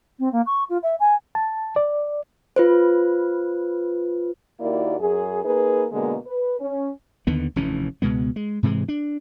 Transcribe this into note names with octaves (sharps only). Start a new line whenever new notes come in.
C4
A#3
C#6
F4
E5
G#5
A5
D5
F4 B4 C5
D#2 A#3 E4 F#4 D5
F#2 G#4
A#3 D#4 G#4 B4
B2 D3 G#3 A#3
B4
C#4
D#2 D3 D#3 B3
F1 D#2 E3 C#4
C#2 B2 G#3 B3
G#3
G#2 C3 E3 G#3
D4